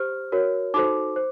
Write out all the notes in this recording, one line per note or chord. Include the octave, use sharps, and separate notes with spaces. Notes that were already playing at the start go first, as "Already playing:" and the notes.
Already playing: G4 C5 F6
F#4 A#4 C#5
D#4 F#4 A4 C5 D6
C5